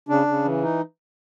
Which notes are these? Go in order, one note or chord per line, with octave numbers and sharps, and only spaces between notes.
C#3 D4
C#3
E3
D#4